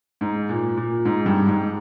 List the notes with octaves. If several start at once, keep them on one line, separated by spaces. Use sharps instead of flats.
G#2
A#2
A#2
G#2
G2
G#2